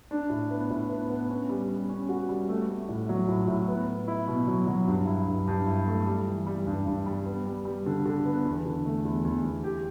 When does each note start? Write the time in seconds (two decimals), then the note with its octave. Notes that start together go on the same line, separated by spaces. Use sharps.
0.11 D4
0.30 A2
0.51 B3
0.70 A2
0.89 B3
1.09 B3
1.30 C#4
1.49 G3
1.69 G3
1.89 C#4
2.09 F#4
2.29 G3
2.49 A3
2.69 A3
2.89 A2
3.09 F#3
3.28 A2
3.48 A2
3.68 B3
3.88 B3
4.08 E4
4.27 B2
4.48 F#3
4.67 F#3
4.87 G2
5.07 E4
5.27 G2
5.47 G2
5.67 E4
5.87 A3
6.07 G3
6.27 E3
6.47 G3
6.67 G2
6.86 G2
7.06 G3
7.26 B3
7.46 G3
7.65 G3
7.86 D3
8.06 D3
8.25 B3
8.45 E2
8.65 D3
8.86 A3
9.05 E2
9.25 E2
9.44 E2
9.64 G4